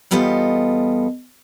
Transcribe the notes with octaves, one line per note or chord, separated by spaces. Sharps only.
E2 G3 B3 F4 A4 D#5